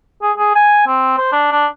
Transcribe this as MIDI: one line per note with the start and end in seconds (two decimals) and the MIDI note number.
0.22 0.32 68
0.37 0.51 68
0.55 0.84 80
0.87 1.15 60
1.18 1.27 72
1.32 1.49 62
1.52 1.66 62